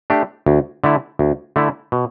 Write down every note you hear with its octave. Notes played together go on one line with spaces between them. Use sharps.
A3 D4 G4
D2
D3 A3 E4
D2
D3 A3 E4
B2